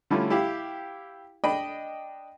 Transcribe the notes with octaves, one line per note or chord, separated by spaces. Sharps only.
D3 G3 A3 C#4 E4 F4
E4 G4 F5
D4 D#5 G5 B5